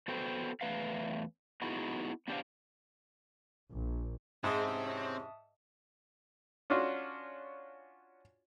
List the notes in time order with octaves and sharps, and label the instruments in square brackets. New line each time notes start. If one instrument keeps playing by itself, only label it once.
[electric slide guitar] B3 F#4 A4 C5 G5
E2 A3 B4 E5 F5
B3 D#4 E4 F#4 G#4
B3 D4 G4 A4 C5 F5
[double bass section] A#1
[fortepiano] G#2 [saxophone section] G#3 [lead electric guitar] C4 [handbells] E5 A5 D#6
[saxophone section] E2 C3 C#4
[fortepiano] C#4 D4 F4 F#4